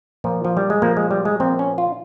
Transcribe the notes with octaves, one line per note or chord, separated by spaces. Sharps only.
A#2 F3
F3
G3
G#3
A#2 F3 A#3
G#3
G3
G#3
A#2 F3 C4
C#4
F4